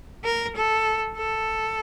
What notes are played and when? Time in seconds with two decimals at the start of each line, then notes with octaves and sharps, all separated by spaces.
0.25 A#4
0.56 A4
1.17 A4